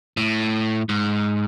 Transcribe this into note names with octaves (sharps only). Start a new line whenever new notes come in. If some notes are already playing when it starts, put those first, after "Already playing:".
A2
G#2